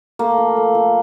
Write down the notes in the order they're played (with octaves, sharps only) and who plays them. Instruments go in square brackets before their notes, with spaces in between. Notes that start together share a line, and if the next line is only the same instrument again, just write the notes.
[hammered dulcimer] A3 A#3
F3
A3
F3